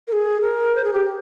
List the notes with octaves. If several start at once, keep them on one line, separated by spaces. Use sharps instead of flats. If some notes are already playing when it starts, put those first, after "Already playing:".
A#4
G#4
A#4
C5
G#4
G4